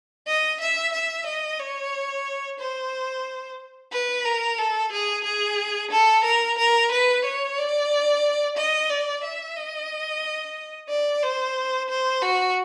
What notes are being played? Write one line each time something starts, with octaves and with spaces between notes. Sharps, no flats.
D#5
E5
E5
D#5
C#5
C5
B4
A#4
A4
G#4
G#4
A4
A#4
A#4
B4
C#5
D5
D#5
D5
E5
D#5
D5
C5
C5
F#4